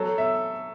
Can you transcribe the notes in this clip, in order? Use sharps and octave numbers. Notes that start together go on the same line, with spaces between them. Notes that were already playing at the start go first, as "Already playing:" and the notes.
Already playing: F#3 A4
E5